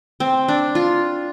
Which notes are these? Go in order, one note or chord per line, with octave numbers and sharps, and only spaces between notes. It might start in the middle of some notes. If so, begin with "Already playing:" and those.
C4
D4
F4